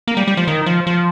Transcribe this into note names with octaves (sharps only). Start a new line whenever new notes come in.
A#3
G3
G3
F3
D#3
F3
F3